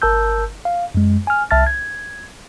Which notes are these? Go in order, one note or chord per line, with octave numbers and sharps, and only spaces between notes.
G1 A#4 A5 E6 G6
F5
F#2 G#3
G#5 F6
C2 E5 A5 F6 A6
G#6